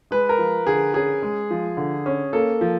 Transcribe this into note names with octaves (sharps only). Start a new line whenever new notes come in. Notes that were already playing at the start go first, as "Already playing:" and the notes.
G#3 B4
A#4
F3
D3 G#4
C#4 G#4
G#3
F3
D3
C#4
A#3 A4
F3